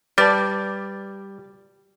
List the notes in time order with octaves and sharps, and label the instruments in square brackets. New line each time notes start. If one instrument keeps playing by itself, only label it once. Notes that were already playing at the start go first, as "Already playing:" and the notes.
[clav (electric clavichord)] G3 [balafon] B4 A5 [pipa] D5